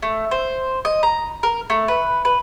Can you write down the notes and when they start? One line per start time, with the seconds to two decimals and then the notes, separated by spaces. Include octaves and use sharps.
0.02 A3
0.31 C5
0.85 D#5
1.03 A#5
1.43 A#4
1.70 A3
1.88 B4
2.25 B4